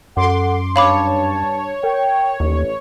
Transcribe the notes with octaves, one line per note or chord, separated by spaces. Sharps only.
F#2 A4 F#5 C6 D6
G2 D4 C#5 F5 A5 B5 D6
A#4 G5
A1 D#2